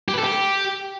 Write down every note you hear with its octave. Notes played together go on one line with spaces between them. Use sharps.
G4
B4
A4
G4